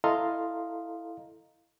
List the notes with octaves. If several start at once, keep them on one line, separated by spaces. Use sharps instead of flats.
E4 A4 D#5 F5 A#5 C6